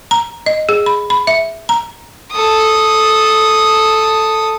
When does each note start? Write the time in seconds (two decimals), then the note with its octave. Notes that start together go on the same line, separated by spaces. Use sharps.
0.11 A#5
0.46 D#5
0.69 G#4
0.86 B5
1.10 B5
1.27 E5
1.69 A#5
2.32 A4 D#6